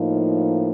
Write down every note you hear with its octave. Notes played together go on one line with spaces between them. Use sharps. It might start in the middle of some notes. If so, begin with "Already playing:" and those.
Already playing: A2 F3 A#3 D#4